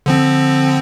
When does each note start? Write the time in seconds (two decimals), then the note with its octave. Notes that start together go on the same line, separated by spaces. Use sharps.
0.06 D3 F3 C4